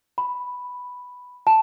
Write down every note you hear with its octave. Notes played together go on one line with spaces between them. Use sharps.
B5
A5